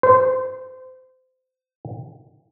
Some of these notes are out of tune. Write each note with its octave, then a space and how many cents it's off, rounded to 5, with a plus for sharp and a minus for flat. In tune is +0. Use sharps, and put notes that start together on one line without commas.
C5 -25